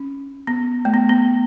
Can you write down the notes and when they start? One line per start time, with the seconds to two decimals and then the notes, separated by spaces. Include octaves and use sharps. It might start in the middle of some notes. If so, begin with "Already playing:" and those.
Already playing: C#4
0.47 B3
0.85 A3
0.94 B3
1.09 B3